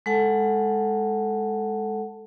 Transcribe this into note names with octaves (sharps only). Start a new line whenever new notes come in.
G#3 A4 F#5 A5